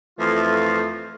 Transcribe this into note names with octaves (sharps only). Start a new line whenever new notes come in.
F2 E3 A3 F4